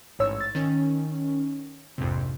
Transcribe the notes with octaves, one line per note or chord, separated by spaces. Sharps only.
A1 G#2 C#5 E6
A6
D#3 C#4
A#1 F2 G#2 C3